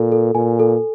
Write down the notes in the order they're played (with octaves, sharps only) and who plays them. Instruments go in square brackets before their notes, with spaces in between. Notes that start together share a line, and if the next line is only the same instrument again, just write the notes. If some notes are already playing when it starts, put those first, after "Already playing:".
Already playing: [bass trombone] A#2 [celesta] A4 A#4
[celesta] A4
[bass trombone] A#2 [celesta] G#5
[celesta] A4